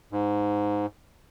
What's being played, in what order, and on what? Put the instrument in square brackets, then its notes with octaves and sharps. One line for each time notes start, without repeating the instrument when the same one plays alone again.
[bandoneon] G#2